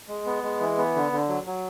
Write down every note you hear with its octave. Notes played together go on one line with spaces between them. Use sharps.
G#3
B3
G#3
E3
B3
D3
D3
F#3
F#3